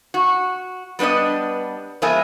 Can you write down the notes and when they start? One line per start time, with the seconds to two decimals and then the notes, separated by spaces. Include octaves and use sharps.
0.14 F#4
0.99 G3 B3 D4 B4 D#5
2.02 F3 G#3 B3 A#4 E5 G#5